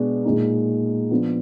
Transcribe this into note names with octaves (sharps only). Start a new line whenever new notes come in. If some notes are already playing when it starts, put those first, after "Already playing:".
Already playing: B2 G#3 B3 D4
A#2 G#3 D#4
F3 B3 D4